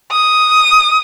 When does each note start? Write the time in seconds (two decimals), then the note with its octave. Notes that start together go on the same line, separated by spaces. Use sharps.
0.12 D#6